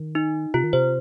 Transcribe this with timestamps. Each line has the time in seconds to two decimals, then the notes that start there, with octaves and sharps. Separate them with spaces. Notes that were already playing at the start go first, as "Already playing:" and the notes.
Already playing: D#3
0.15 D#4
0.54 C3 F4
0.64 D#3
0.73 C3 C5